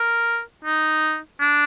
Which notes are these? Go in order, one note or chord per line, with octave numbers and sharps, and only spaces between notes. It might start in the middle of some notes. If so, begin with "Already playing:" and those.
Already playing: A#4
D#4
D4